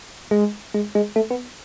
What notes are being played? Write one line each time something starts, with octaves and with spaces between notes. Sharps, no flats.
G#3
G#3
G#3
A3
B3